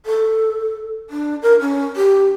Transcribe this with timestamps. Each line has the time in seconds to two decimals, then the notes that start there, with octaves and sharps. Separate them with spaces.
0.06 A4
1.10 D4
1.43 A#4
1.60 C#4
1.96 G4